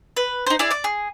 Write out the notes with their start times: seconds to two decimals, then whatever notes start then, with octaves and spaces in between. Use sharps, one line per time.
0.17 B4
0.47 D#4 C5
0.59 E4 G#4 D5 D6
0.71 D5 D6
0.84 G#4